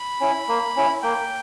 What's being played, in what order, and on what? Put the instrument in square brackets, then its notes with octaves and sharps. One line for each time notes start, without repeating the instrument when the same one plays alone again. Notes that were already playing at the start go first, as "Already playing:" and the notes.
Already playing: [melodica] B5
C#4 E4
A#3
C#4 E4
A#3 G5